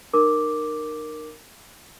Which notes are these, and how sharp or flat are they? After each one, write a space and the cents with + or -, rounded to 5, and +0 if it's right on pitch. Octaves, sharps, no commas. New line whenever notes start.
D#4 -35 A#4 +0 D6 +0